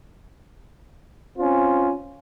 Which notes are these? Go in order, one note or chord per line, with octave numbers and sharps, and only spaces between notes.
C4 C#4 F4